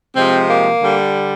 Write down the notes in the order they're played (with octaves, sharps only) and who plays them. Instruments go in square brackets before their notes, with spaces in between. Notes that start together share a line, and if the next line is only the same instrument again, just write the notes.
[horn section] C3 F3 G#3 C4
A#3
D3 G3